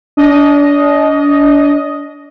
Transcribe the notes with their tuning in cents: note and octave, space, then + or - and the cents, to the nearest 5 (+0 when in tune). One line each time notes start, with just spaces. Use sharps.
D4 -35 D#5 +0